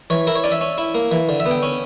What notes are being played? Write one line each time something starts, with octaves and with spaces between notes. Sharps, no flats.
E3 C#5
E4 A#4
C#5
C#4 D5
E5
C#4
E4
A#3
E3
D3
E5
B3
G5
C#4